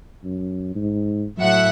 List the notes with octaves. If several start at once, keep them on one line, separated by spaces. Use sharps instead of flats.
F#2
G#2
A2 F#3 E5 F#5